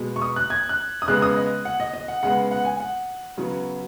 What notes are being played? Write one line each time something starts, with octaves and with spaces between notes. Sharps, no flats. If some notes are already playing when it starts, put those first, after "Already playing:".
Already playing: B2 G#3 B3
C#6
D#6
F#6
G#6
F#6
D#6
C#3 G#3 B3 F#6
D#6
D#5
F#5
D#5
D#5
F#5
C#3 G#3 B3 F#5
F#5
G#5
F#5
C#3 F#3 B3